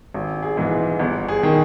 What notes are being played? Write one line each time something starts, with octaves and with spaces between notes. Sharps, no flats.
G#1
G#4
G#2 E3
G1
G#4
D#3